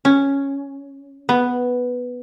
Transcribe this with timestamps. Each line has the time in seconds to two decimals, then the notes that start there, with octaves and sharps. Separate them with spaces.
0.05 C#4
1.29 B3